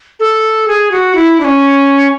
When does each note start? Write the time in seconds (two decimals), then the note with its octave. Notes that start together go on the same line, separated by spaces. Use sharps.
0.20 A4
0.68 G#4
0.91 F#4
1.15 E4
1.40 D4
1.45 C#4